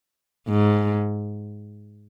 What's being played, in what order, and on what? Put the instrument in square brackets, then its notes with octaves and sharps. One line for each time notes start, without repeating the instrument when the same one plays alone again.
[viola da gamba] G#2